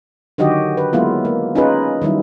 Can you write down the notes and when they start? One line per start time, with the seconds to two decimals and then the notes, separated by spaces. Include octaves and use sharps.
0.38 D3 D#3 F#3 F#4 G4 D#5
0.77 B4
0.93 F#3 G#3 A#3 B3 E4 F4
1.25 A#3
1.55 C#4 D#4 F4 G#4 B4
2.02 D#3 F#3 G3 E4